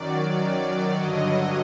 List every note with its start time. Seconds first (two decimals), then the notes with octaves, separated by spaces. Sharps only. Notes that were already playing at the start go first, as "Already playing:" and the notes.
Already playing: F#2 D#3 F#3 D5
0.93 G2 D3 F#3 D#5